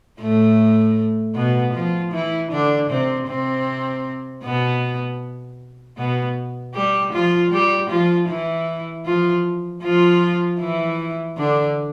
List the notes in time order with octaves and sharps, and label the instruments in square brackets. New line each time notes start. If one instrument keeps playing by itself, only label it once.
[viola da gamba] A2 A3
B2 B3
F3 F4
E3 E4
D3 D4
C3 C4
C3 C4
B2 B3
B2 B3
G3 G4
F3 F4
G3 G4
F3 F4
E3 E4
F3 F4
F3 F4
E3 E4
D3 D4